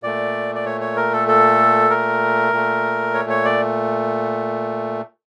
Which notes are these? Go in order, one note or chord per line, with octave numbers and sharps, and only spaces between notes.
A#2 A3 D5
D5
C#5
C#5
A#4
A4
A4
A#4
A#2 A3
C#5
C#5
D5